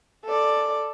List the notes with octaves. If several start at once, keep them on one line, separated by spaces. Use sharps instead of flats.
A4 D5